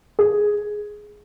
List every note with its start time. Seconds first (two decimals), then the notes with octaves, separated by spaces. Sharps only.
0.19 G#4